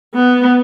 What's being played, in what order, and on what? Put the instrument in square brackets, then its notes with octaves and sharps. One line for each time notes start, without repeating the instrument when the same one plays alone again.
[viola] B3